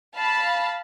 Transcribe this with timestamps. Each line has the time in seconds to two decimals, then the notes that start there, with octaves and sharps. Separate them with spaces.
0.15 F5 A5 B5